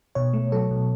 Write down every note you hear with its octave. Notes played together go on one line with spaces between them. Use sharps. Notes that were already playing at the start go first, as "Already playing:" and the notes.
B2 C#5
A3
F#3 A4
B2